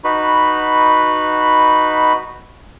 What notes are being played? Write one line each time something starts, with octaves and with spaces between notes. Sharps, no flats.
D#4 F#4 B4 B5